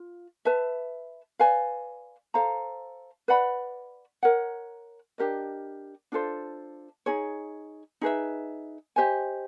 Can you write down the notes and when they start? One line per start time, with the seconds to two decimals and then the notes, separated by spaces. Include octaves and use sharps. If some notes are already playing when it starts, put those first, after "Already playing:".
Already playing: F4
0.45 B4 E5 A5
1.39 B4 D5 F5 G#5
2.34 A4 C5 F5 A#5
3.28 B4 D5 F#5 B5
4.23 A#4 C#5 F#5
5.18 D4 G4 A#4 D#5
6.12 D4 F4 A4 C5
7.06 D#4 G#4 C#5
8.01 D#4 G#4 B4 E5
8.96 G4 C5 D#5 G#5